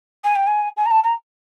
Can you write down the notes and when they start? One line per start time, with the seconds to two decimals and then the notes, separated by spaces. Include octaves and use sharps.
0.24 G#5
0.36 G5
0.47 G#5
0.77 G#5
0.86 A#5
0.91 A5
1.04 A#5